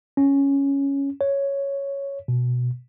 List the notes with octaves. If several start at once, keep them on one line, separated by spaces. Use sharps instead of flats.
C#4
C#5
B2